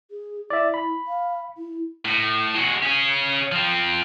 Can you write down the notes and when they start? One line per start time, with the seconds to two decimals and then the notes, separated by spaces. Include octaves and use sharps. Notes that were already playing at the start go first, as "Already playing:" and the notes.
0.11 G#4
0.50 E4 D5 E5
0.74 B5
1.07 F5
1.57 E4
2.05 A2
2.55 G#3 F#4
2.83 C#4 G#4
3.52 F3 C4